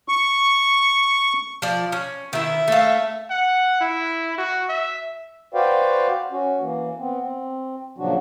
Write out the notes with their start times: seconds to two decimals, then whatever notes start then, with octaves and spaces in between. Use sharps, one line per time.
0.08 C#6
1.62 F3 D5
1.92 C#4
2.33 D#3 E4 E5
2.68 A3 F5
3.30 F#5
3.80 E4
4.38 F#4
4.69 E5
5.54 F#4 B4 C5 D5 F5 G5
6.32 C#4 F#4
6.61 E3 A#3
6.98 B3 C4
7.21 C4
7.98 A#2 C#3 F3 F#3 D4 F#4